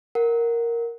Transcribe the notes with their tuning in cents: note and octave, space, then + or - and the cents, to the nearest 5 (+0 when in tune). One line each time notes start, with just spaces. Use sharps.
A#4 +0 F#5 +0